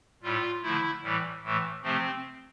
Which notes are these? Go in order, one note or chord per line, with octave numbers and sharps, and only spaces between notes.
A2 G3 F4
D3 F3 A3 E4
A2 E3 G3
A2 E3 A3
C3 F3 A3 C4